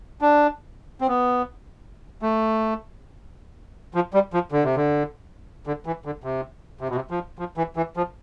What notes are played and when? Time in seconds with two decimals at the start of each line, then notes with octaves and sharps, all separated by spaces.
0.21 D4
1.01 C4
1.08 B3
2.22 A3
3.94 F3
4.14 G3
4.33 F3
4.52 D3
4.64 C3
4.76 D3
5.67 D3
5.86 E3
6.05 D3
6.24 C3
6.81 C3
6.89 B2
6.95 C3
7.11 F3
7.39 F3
7.57 E3
7.76 E3
7.97 F3